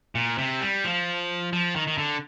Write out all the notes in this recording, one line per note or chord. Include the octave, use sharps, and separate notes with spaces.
A#2
C3
G3
F3
F3
D#3
D#3
D3